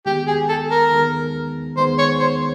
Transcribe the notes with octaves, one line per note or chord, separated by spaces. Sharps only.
D#3 G#3 B3 G4
G#4
A4
A#4
D#3 G#3 B3
D#3 G#3 B3 C5
C#5
C5